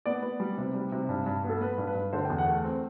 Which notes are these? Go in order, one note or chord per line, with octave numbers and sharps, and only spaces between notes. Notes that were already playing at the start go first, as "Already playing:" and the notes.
B3 D5
B3
G3
C3
G3
C3
G2
G2
B3
A4
B3 B4
G2
B4
G2
D3 C5
G5
E2
F#5
A3
C4